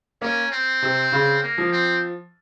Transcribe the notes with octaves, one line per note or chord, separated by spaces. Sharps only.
A#3 C#4
C4
C3
C#3
A#3
F3
C4